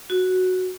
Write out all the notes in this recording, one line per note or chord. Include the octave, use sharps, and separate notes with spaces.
F#4